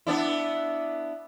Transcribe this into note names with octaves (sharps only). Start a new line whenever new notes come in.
B3 D4 E4